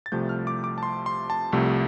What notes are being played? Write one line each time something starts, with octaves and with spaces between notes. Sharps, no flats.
A6
C2 C3 F3 A3 G6
F6
D6
D6
A5
C6
C6
A5
C2 C3 F3 A3